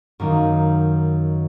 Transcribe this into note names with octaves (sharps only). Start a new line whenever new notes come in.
F#2 D#3 A#3 D#4